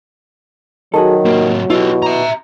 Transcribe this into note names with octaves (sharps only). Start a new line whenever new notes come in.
D#3 F#3 F#4 G#4 A4
C3 A#3 F#4
B2 E4 F4 G4
E5 A#5